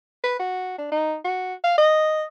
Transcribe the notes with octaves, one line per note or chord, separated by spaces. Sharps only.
B4
F#4
D4
D#4
F#4
F5
D#5